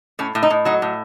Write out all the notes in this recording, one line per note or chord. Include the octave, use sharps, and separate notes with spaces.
A2 C#4
A2
D#4
A2
F#3 D#4
A2